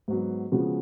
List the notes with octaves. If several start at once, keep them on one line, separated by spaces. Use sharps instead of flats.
G#2 F#3 B3
C#3 F3 G#3 B3 F#4